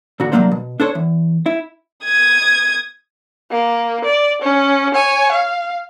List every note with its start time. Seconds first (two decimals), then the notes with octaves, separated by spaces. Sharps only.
0.20 A#2 D3 F#4
0.32 C2 G#2 F#3 A#3 D4 C5
0.51 B2
0.80 D4 A4 C5 C#5
0.95 E2
1.46 E4
2.03 D#6 G#6
3.51 A#3
4.05 D5
4.42 C#4
4.95 C#5 G#5
5.32 F5